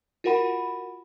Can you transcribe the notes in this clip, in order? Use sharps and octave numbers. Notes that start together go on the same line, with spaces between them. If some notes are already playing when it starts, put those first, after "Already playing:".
F4 F#4 A#4 F#5 B5